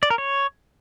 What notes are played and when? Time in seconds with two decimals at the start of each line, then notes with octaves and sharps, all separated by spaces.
0.03 D5
0.10 A#4
0.18 C#5